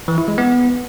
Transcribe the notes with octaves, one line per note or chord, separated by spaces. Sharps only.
E3
E4
G#3
B3